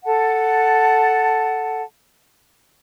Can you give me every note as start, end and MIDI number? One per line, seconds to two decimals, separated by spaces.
0.05 1.82 69
0.05 1.82 78
0.05 1.82 81